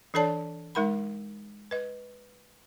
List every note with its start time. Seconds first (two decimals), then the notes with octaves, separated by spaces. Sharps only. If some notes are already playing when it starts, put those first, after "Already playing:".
0.14 E3 D4 A4 C#5 D5 A5
0.75 G#3 D#4 A#4 F#5 B5
1.71 B4 D#5